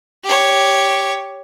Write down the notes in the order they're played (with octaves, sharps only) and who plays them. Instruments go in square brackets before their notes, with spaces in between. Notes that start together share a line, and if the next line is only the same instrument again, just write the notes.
[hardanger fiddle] G4 C#5